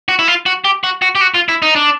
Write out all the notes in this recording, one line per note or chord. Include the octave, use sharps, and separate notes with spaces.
F#4
E4
F4
F#4
G4
F#4
F#4
G4
F#4
F4
E4
D#4
D4